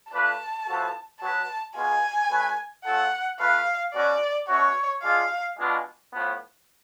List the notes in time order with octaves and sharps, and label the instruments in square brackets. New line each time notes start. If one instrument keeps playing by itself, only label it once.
[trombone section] A3 D4 F4 B4 [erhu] A5
[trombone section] A2 F3 B3 F#4 A4
[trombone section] F#3 B3 F#4 B4 [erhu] A5
[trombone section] B2 G#3 B3 F4 G#4 [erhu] G#5
[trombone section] A3 C#4 F#4 B4
[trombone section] A3 C#4 F4 A4 [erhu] F#5
[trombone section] A3 F4 B4 [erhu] F5
[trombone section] B2 F#3 C#4 F#4 [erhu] D5
[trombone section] B2 A3 C#4 F#4 [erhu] C#5
[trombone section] G#3 D4 F4 [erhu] F5
[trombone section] B2 G#3 B3 D4 F4
A2 F3 B3